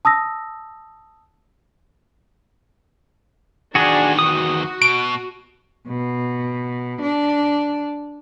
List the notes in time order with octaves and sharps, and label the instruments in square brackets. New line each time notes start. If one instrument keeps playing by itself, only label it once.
[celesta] A5 D#6 E6 A#6
[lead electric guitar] E2 D#3 [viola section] D4 [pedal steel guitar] F#4 G#4
[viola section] F#4 [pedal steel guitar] D#6
[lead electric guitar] B2 [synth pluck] D7
[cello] B2
D4